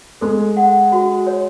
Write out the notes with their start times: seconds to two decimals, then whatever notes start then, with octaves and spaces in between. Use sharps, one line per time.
0.21 G#3 A4
0.57 F#5
0.92 F#4
1.27 C#5